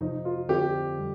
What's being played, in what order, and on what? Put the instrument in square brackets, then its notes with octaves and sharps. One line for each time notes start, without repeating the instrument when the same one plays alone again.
[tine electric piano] F2 C3 F3 [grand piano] D#4
[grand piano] F4
[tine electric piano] F2 D3 F3 C4 F4 [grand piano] G4
[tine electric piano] D3 G3